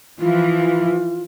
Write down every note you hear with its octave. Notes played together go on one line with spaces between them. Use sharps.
E3 F3 F4